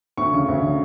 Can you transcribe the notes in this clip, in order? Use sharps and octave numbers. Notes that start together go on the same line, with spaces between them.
D2 C#6
C#3
D2
C#3